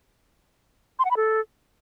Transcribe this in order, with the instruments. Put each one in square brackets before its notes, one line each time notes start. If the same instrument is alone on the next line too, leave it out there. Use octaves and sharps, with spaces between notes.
[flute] C6
F#5
B5
A4